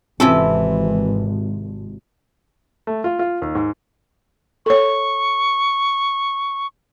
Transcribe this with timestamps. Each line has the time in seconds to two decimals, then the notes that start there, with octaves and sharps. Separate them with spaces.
0.20 G#1 C3 E3 C4 C#4 E4 F4 A4
2.87 A3
3.04 F4
3.19 F4
3.42 D#2
3.55 G#2
4.66 A4 C#5 C#6